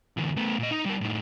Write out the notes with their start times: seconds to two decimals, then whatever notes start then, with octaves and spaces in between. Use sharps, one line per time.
0.17 D2 E3
0.37 A3 B3
0.59 A#2 D#5
0.71 D#4
0.85 G3 A#4
1.01 A2 D#4